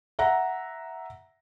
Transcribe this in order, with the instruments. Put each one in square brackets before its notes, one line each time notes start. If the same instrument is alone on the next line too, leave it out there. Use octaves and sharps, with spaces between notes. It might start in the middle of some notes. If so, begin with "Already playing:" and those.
[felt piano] E5 F#5 A#5